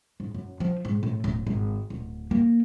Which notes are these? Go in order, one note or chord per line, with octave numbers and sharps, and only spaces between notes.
G#2
F#2
F3
G#2
A2
D1
G#1
D1
A#3